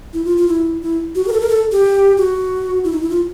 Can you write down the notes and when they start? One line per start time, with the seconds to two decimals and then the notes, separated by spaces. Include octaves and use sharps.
0.13 E4
0.25 F4
0.37 F4
0.48 E4
0.81 E4
1.15 F#4
1.24 G4
1.28 A#4
1.32 A4
1.41 A#4
1.49 A4
1.72 G4
2.17 F#4
2.84 E4
2.93 D#4
3.01 E4
3.10 F4